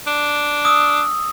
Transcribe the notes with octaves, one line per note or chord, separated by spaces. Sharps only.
D4
D#6 E6